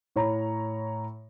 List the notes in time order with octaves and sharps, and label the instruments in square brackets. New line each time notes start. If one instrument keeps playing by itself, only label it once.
[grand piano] A2 C#5 A#5 B5